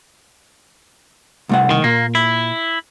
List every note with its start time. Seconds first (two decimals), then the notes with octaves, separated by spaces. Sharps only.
1.49 C2 A3 F#5
1.71 D#3
1.84 A#2 A#3
2.15 E4